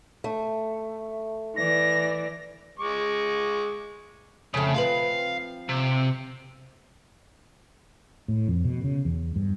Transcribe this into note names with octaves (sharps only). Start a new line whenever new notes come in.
A3
E3 D5 A#6
G#3 C#6 D6
F2 C#3 A3
F3 C4 B4 F5
C3
A2
F2
B2
C#3
E2
G2